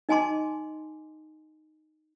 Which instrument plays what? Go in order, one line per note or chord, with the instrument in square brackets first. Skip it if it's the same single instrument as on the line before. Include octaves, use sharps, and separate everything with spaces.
[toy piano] D#4 D#5 G#5 A5 C6 D6